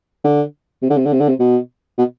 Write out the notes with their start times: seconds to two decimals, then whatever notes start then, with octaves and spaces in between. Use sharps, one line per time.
0.24 D3
0.82 C3
0.90 D3
0.97 C3
1.06 D3
1.13 C3
1.20 D3
1.28 C3
1.39 B2
1.98 B2